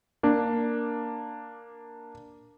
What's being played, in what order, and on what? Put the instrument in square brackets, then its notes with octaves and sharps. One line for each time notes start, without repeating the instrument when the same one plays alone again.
[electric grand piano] A#3 D4